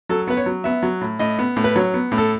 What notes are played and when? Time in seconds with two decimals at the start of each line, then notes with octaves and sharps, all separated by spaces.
0.09 F#3 A4
0.28 B3 B4
0.37 C#5
0.46 F#3
0.64 B3 E5
0.83 F#3
1.01 A2
1.19 A2 D#5
1.39 B3
1.56 A2
1.64 B4
1.76 F#3 C#5
1.94 B3
2.12 A2
2.18 A4